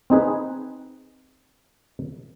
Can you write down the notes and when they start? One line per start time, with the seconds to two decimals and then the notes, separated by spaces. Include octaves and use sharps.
0.10 C4 D#4 G#4 B4